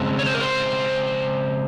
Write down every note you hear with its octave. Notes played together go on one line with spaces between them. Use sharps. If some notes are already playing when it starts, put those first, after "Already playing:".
Already playing: C#3 G#3 C4
C#5
C5
A#4
C5